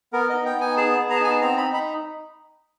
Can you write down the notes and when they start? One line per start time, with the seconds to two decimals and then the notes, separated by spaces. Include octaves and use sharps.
0.13 B3 A#4
0.30 D#4 D#5
0.46 G5
0.56 B3 G#5
0.77 G#4 A5
0.99 B3
1.10 A#5
1.16 A5
1.20 D#4 G#5
1.30 A5
1.41 C4 A#5
1.57 B5
1.63 D#4
1.74 B5